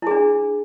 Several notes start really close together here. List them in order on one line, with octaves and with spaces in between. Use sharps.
E4 G#4 D4